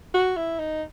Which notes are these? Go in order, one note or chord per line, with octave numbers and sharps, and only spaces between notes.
F#4
E4
D#4